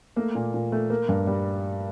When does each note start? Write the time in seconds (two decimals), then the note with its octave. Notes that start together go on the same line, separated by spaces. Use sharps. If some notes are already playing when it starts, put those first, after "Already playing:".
0.16 A3 A#3 A#4
0.35 A#2
0.54 A#2
0.72 A3
0.90 A#3
1.09 G2
1.27 G3